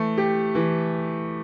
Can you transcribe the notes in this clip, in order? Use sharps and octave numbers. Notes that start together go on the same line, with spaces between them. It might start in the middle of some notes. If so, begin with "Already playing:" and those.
Already playing: E3 A3
G4
E3